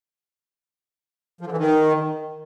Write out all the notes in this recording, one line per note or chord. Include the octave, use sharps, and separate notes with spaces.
F3
D3
E3
D#3